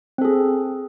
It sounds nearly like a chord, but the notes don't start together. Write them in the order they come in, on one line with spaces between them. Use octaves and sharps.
C4 A4 G#4